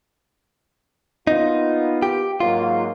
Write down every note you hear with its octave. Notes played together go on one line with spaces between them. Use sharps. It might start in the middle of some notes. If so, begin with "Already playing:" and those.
A#3 B3 D#4 F4
G4
G#2 F#3 A#3 F4